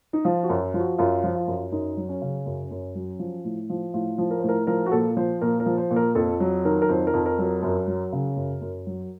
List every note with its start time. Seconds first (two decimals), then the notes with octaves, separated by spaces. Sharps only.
0.13 D#4
0.25 F3 F4
0.43 F#4
0.49 F#2
0.74 F3
0.79 F#4
0.98 F#2 F4
1.24 F3
1.35 F4
1.47 F#2
1.72 F#2 D#4
1.97 F#3
2.09 C#4
2.22 C#3
2.46 F#2
2.71 F#2
2.95 F#3
3.19 F3
3.44 A2
3.70 F3
3.94 A2 F4
4.18 F3
4.31 A#4
4.39 C5
4.43 A2
4.49 A#4
4.67 F3 A#4
4.86 F#4
4.92 A#2 A4
5.17 F3 C5
5.41 A#2 A#4
5.60 A#4
5.66 F3
5.78 C5
5.91 A#2
5.96 A#4
6.15 F2 A4
6.40 F#3
6.65 D#3 A#4
6.82 A#4
6.89 F2 C5
7.07 A#4
7.14 F2
7.26 A#4
7.38 F#3
7.44 A#4
7.63 F#2 A#4
7.87 F#3
8.13 C#3
8.36 F#2
8.61 F#2
8.86 F#3